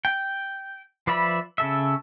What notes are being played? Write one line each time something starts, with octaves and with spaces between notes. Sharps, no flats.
G5
F3 B4 D5 E5 B5
C#3 A4 E5